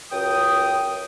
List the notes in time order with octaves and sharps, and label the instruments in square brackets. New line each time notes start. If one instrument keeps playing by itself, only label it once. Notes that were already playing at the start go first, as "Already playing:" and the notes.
[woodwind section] C#2 F#2 G5 D#6